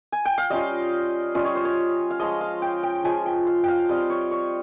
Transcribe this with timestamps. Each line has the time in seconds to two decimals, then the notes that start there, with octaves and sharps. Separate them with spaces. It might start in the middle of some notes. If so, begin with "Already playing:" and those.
0.12 G#5
0.25 G5
0.38 F5
0.50 G3 C#4 F4 D#5
1.34 G3 C#4 F4 D#5
1.45 C#5
1.55 C5
1.65 C#5
2.11 F5
2.19 F3 G#3 C#4 F4 D#5
2.41 F5
2.62 G5
2.83 G5
3.04 F3 G#3 C#4 F4 G#5
3.25 G5
3.47 F5
3.64 F5 G5
3.89 G3 C4 F4 D#5
4.10 C#5
4.31 C#5